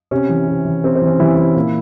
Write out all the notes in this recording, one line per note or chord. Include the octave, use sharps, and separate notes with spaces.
C3 C#4
E3
C3
E3
C3 C4
C4
E3
C#4
C3 E3 E4
E3
A#2